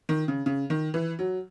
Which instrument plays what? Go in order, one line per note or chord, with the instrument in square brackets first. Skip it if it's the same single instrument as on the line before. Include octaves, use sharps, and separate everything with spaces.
[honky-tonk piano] D#3
C#3
C#3
D#3
E3
F#3